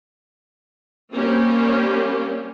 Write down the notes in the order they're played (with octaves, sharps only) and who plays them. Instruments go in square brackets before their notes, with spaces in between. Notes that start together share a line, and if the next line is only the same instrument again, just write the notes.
[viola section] G3 A#3 C4 C#4 G4